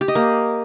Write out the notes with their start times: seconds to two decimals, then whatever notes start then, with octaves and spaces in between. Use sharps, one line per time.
0.01 G4
0.08 D#5
0.15 A#3